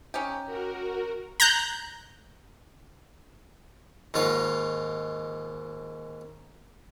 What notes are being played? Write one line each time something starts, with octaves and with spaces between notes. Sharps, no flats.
C#4 D#4 G4
F#4 A#4
A#5 F#6 G6
D#2 G#2 F4 C#5